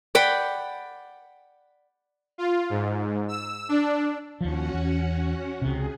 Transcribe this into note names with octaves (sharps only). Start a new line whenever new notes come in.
D5 F#5 G5 B5
F4
G#2
E6
D4
D#2 F3 C#4 F#4 F#5
E2
C#2 C3 G#4